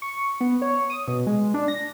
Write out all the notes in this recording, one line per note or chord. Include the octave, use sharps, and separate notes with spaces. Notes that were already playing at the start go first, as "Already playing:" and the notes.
C#6
B3
C#5
D#6
B2
G#3
D4
A#6